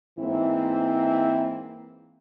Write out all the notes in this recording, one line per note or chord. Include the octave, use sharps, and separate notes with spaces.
G#2 E3 A#3 C4 E4